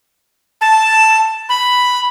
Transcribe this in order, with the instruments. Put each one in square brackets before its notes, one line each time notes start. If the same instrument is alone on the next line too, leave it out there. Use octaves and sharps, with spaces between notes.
[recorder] A5
B5